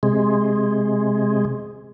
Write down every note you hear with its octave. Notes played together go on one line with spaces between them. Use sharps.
C3 G#3